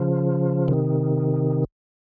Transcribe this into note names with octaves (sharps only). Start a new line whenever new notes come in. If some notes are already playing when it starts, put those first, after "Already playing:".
Already playing: C#3 F3
C3 D#3